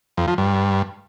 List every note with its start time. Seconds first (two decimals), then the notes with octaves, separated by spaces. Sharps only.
0.17 F2
0.28 F3
0.38 G2